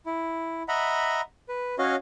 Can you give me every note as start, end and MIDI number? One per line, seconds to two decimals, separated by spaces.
0.06 0.63 64
0.68 1.21 75
0.68 1.21 76
0.68 1.21 78
0.68 1.21 82
0.68 1.21 83
1.49 1.75 71
1.79 1.96 61
1.79 1.96 66
1.79 1.96 73
1.79 1.96 75
1.79 1.96 77